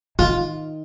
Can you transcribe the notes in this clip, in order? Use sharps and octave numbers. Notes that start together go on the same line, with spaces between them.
D#3 F4